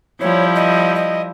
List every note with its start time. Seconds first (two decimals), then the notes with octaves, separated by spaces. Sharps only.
0.21 F3 G3 E4 C#5
0.56 D#5
0.95 D#5